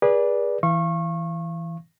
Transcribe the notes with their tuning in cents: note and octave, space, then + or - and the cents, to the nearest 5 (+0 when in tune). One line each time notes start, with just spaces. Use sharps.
G#4 -20 B4 -30 D5 -5
E3 +0 F5 -30 C#6 -30